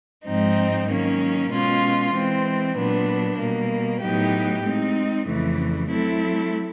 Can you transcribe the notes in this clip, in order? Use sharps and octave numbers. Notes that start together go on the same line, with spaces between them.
G#2 F3 G#3 C4 D#4
D#3 F#3 A#3 C#4
B2 G#3 C#4 F4
E3 G#3 C4
A#2 F#3 B3 D4
B2 G3 A#3
A2 F#3 B3 D#4 G4
G#3 C4 D#4
F2 C#3 E3 A3
F#3 A3 C4 E4 A4